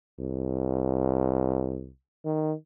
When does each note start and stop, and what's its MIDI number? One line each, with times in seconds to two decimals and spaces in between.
0.20 1.90 36
2.25 2.53 51